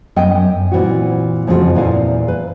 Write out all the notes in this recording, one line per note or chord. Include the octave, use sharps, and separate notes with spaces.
F#2 B3 D#5 G5
F#2
A#2 E3 C4 F#4
F2 C#3 C4 D4 F4 F#4
E2 A#2 E4 A#4 F5 G#5
B4